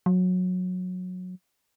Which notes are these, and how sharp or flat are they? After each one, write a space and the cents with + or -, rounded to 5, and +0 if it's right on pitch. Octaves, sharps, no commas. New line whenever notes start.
F#3 -20